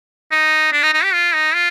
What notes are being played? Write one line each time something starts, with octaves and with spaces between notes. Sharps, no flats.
D#4
D4
D#4
D#4
G4
F4
D#4
F4